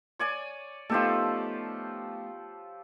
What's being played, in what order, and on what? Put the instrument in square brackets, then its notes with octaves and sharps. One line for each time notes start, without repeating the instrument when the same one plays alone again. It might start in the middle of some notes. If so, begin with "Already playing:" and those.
[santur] C#5 D5 G#5
[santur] F3 G4 A4 [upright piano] A3 B3 D#4